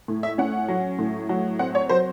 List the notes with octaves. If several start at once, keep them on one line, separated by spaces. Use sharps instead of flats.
A2
E5
C#4 F#5
F#3
A2
F#3
C4 F#5
C#5
F#3 C5